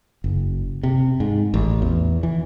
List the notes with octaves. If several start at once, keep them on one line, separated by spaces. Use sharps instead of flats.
F#1
C3
G#2
A1
E2
E3